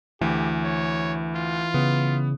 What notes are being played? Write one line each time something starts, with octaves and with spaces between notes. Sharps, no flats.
D2 E3 G4
C#5
F4
C#3 B3